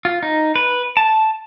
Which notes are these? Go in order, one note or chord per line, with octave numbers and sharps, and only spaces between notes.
F4
D#4
B4
A5